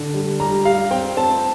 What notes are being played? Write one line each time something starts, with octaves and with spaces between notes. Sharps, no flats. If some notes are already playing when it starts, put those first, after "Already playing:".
Already playing: D3
G3
G3 A#5
G3 F5
C4 G5
C4 A5